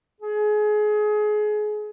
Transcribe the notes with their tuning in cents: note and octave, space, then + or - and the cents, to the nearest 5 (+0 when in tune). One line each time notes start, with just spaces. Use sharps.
G#4 +25